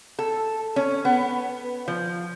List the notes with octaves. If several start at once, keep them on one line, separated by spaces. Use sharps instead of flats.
A4
C#4
B3
F3